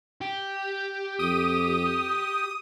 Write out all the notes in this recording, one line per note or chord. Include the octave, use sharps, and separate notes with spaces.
G4
F2 D#6